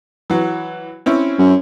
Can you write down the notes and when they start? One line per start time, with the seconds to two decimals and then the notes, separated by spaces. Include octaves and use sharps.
0.30 E3 F#3
1.06 C4 C#4 E4
1.39 F#2